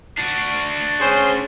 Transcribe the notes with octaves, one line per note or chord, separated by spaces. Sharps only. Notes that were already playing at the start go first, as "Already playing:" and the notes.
D4 F#4
C#4 G#4 C5